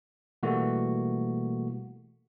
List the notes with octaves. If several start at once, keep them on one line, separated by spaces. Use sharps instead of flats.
B2 E3 G3 A3 A#3 F#4